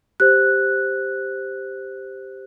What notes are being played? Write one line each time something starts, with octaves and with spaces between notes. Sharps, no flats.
G4 C5 F#6